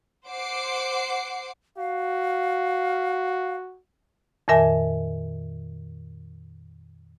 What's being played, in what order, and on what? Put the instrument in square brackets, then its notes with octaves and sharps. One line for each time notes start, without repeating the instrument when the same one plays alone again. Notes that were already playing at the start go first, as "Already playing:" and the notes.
[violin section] C5 F#5 D6 C7 D7
[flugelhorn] F#4 [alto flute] F5
[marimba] F2 A#2 D#3 A#4 E5 G#5